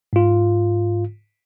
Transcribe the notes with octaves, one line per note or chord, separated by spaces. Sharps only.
G#2 F4